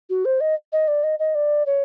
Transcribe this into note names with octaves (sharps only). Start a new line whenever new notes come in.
F#4
C5
D#5
D#5
D5
D#5
D#5
D5
C#5